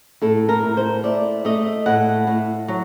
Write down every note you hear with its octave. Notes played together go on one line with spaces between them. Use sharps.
A2 A4
A#4
A2
C5
A3 D5
A3 D#5
A2 F#5
A2
F#3